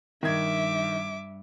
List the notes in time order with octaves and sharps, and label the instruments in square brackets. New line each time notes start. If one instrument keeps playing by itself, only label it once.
[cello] G2 [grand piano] D#3 G#6 [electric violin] E5 D6